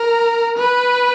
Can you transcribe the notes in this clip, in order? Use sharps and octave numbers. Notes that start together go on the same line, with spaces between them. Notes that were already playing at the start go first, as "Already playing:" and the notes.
Already playing: A#4
B4